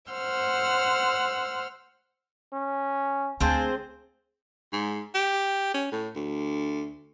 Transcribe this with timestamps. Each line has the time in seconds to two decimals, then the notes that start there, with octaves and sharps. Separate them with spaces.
0.12 C5 F#5 E6 F6
2.53 C#4
3.40 D2 C4 G#4 C5 F5 G#5 A5
4.73 G#2
5.15 G4
5.74 C#4
5.92 A2
6.15 D2